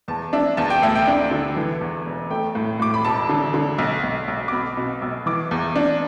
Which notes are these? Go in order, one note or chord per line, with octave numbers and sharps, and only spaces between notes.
E2 A5
D4 E5
E2 A5
G5
D2 E5
G5
D4
D3
E3
E2
E1
A3 G5
A2
A2 D6
B5
E1 A5
D3
D3
B1
B1
B1
D6
B2 B5
B2
B1
E3 D6
E2
D4